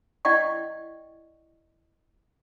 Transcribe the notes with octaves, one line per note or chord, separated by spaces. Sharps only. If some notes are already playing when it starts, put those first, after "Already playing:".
E4 D5 D#5 F#5 G5 C#6